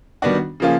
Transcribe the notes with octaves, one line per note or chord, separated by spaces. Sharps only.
D#3 G3 B3 D4 F#4
C#3 F3 A#3 C#4 F4